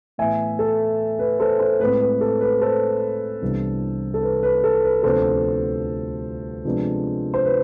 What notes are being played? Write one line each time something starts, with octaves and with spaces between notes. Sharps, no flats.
A2 E3 B3 E5 G#5
A4
B4
A4 C5
A4 C5
A2 G#3 C4 B4
B4
A4
B4
A4 C5
C2 C3 E3 B3 D4
A4
B4
B4
A4
B4
D2 C3 F3 B3 A4 C5
C3 F3 G#3 B3 D4
C5
B4